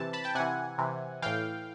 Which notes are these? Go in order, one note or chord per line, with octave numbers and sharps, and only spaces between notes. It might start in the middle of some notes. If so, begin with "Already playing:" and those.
Already playing: C3 E3 A5
A5 B5
G5 A5
C3 E3 F#5 G#5
C3 E3
A2 E3 F5 G5